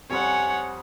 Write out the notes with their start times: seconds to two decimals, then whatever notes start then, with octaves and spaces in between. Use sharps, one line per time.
0.10 F2 G3 C5 C#5 F#5 G#5